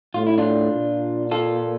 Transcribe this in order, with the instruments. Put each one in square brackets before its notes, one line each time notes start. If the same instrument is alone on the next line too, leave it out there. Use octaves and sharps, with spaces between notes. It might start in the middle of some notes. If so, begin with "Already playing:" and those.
[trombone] A2 [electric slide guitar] F4
[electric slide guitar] E4
D4 F4
[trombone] A#2
[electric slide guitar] F4 A4